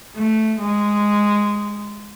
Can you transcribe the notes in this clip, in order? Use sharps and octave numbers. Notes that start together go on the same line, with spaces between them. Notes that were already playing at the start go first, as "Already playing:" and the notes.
A3
G#3